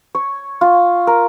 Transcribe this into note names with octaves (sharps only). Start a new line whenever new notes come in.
C#5
F4
A#4